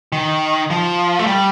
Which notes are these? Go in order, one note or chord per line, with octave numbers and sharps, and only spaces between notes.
D#3
F3
A3
G3